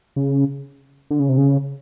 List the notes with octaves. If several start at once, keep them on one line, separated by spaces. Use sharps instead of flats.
C#3
D3
C#3
C3
C#3